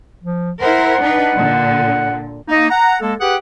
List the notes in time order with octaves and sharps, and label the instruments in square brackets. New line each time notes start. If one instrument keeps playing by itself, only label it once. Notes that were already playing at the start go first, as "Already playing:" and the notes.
[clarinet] F3
[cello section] E4 A#4 C5 [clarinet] F#5
[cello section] D4 D#4 B4
A#2 D3
[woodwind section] A#3 D#4
F#5 A#5
G#3 A#3 A4
G4 G#4 B4 F#5 G5